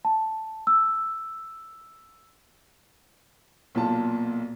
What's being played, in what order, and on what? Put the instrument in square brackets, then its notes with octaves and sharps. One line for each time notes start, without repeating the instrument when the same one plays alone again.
[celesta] A5
E6
[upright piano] B1 A#2 F4 A5